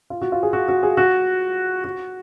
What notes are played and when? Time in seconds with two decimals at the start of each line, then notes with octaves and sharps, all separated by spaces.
0.10 F4
0.22 F#4
0.32 F4
0.43 G#4
0.53 F#4
0.68 F#4
0.83 G#4
0.97 F#4
1.84 F#4